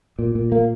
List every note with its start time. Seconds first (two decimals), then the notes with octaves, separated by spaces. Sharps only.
0.19 A#2
0.35 A#2
0.52 A#3